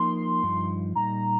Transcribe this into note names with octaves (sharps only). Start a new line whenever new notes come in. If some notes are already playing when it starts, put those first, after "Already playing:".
Already playing: F3 A#3 D#4 A#4 C6
G2 F3 D#4
A#2 G3 D#4 A#5